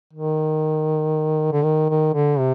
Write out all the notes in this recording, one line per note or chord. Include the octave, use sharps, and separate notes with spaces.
D#3
D3
D#3
D#3
D3
C3